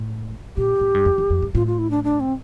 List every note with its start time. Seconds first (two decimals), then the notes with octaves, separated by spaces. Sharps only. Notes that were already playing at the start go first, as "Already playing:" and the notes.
Already playing: A2
0.57 A#2 G4
0.81 A2
0.94 G2
1.05 F2
1.18 E2
1.30 F2
1.42 G2
1.55 A2 F4
1.67 F4
1.78 E4
1.91 D4
2.04 D4
2.20 C4